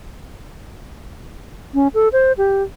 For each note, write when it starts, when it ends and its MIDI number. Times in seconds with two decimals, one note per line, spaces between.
1.74 1.88 61
1.94 2.09 69
2.13 2.32 72
2.38 2.63 67